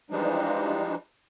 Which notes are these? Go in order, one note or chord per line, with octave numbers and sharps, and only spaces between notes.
E3 F3 G3 G#3 D4 D#4